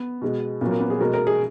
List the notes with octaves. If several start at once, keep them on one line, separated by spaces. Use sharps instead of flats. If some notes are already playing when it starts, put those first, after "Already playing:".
Already playing: B3
B2 G#3
A#2 F#3 B3
A#3
B3
G#4
B2 G#3 A#4
A#4
G#4